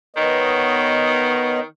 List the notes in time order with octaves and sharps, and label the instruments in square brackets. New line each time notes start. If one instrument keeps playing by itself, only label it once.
[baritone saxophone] D#3 [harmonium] B3 C#5 D#5